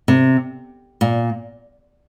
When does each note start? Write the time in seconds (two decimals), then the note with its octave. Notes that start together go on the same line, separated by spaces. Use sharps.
0.08 C3
1.01 A#2